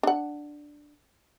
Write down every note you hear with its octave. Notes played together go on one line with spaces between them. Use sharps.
D4 F#5